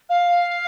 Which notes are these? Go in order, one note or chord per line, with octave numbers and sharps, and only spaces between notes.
F5